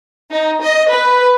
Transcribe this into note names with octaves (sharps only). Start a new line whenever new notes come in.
D#4
D#5
B4